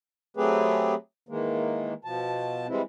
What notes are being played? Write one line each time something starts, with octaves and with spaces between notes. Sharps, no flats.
F#3 A3 C4 G4 G#4 B4
D#3 E3 G#3 A#3
B2 F3 A5
E3 G3 G#3 C4 E4